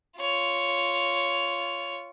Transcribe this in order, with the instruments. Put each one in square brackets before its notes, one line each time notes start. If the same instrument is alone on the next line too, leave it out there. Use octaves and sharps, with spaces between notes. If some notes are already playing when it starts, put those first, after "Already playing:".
[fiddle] F4 C#5